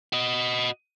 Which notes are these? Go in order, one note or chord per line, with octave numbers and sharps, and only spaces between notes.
F#4 D#5